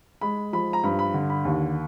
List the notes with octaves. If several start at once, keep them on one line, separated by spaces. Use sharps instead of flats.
G#3 B5
F3 B5
A#5
G2 B5
B5
D3
B5
D#2